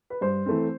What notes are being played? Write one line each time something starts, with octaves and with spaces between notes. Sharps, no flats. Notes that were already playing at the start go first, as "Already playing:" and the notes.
B4
G2 C5
E3 A3 C4